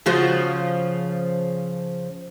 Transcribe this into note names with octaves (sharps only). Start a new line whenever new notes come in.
C#3 F3 F#4